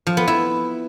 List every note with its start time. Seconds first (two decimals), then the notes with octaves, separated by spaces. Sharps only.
0.07 F3
0.17 B3
0.28 E4